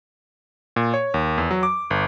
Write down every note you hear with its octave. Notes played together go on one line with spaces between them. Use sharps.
A#2
C#5
D#2
E2
F#3
D6
G1